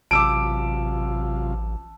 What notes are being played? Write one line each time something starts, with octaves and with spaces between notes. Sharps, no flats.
A1 C3 F#3 F4 A5 D6 E6 D7